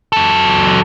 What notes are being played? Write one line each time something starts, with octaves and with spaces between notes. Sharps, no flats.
F#3 A4